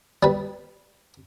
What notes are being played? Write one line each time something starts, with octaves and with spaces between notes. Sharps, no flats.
G3 B4